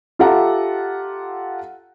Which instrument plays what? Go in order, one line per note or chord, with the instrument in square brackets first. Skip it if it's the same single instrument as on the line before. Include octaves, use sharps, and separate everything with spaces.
[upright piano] F4 G4 A4 E5 F#5 A#5